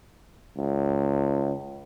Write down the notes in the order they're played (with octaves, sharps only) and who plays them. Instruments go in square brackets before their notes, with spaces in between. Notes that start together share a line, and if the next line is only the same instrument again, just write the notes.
[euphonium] C#2